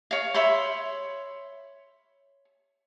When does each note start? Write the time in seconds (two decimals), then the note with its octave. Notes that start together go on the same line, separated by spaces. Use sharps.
0.11 C#5 F5
0.34 C#5 E5 B5 C6